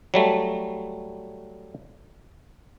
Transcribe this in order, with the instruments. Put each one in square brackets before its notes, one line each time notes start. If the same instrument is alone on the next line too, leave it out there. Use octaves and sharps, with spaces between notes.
[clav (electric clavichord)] F#3 G3 A3